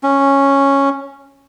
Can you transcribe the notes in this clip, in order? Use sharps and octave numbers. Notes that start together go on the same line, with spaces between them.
C#4